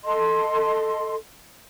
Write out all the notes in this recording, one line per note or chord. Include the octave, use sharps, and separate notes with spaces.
A4 D#5 C6